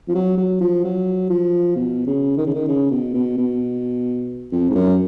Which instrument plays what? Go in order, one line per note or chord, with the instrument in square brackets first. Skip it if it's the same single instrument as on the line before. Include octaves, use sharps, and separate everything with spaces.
[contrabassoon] F3
F#3
F#3
F3
F#3
F3
B2
C#3
D#3
C#3
D#3
C#3
B2
B2
B2
F2
G#2
F#2